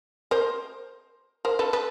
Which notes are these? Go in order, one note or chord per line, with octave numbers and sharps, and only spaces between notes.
A#4 C5
A#4 C5
A4 B4
A4 B4